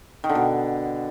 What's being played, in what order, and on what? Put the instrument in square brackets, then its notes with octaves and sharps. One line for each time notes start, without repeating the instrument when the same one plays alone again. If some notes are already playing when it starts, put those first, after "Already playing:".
[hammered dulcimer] D#3
D3
B2